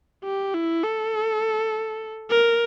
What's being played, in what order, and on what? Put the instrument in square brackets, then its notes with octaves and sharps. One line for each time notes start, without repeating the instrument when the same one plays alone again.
[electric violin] G4
E4
A4
A#4